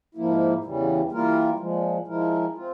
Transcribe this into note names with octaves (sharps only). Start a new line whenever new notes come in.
G#2 F3 A#3 E4
E2 C#3 E3 G3
E3 G3 A#3 F4 A#4
A#2 F3 G#3
F3 G#3 E4 A#4
C4 F4